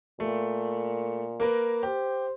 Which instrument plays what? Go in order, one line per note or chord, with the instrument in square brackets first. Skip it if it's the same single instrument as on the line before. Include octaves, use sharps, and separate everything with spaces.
[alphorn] A#2 [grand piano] A3
[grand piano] A#3 A#4 B4
[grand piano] G4 [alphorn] C5